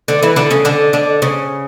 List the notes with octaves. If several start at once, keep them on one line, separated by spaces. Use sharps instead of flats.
D3 D4
E3 E4
D3 D4
C#3 C#4
D3 D4
D3 D4
C#3 C#4